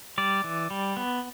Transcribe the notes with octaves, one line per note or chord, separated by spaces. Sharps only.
G3 D5
E3
G3
B3